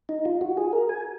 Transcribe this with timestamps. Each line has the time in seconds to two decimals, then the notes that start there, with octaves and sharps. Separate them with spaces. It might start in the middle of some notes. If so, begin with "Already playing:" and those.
0.09 D#4
0.25 F4
0.41 F#4
0.57 G#4
0.73 A#4
0.89 G#5